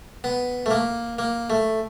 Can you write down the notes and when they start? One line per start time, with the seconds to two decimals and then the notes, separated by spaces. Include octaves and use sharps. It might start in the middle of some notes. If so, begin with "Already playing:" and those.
0.24 B3
0.66 A3
0.71 A#3
1.19 A#3
1.50 A3